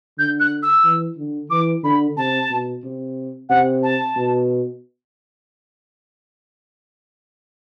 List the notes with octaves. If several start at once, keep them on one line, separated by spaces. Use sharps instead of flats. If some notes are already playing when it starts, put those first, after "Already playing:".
D3 G6
F#6
E6
E3
D3
E3 D6
D3 B5
C3 A5
B2
C3
C3 F#5
A5
B2